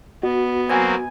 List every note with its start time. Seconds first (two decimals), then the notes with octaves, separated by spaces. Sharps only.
0.23 B3 F#4 D#5
0.69 F#3 A#3 C4 G#5